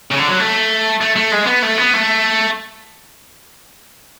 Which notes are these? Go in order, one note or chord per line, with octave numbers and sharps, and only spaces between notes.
C#3
D3
F#3
A3
A3
A3
G#3
B3
A3
B3
A3